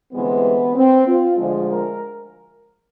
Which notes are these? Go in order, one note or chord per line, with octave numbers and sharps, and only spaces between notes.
D2 C3 E3 G#3 B3
C4
F4
D2 D3 F3 G#3
A#4